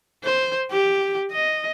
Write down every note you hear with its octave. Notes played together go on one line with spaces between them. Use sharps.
C5
G4
D#5